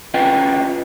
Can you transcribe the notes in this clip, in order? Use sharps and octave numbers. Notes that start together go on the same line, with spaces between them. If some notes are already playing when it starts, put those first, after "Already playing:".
C#4 F4 B4 D#5 G5